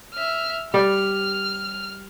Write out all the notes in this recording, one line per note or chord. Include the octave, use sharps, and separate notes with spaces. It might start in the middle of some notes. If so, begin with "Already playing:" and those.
E5 F6
G3 D5 F6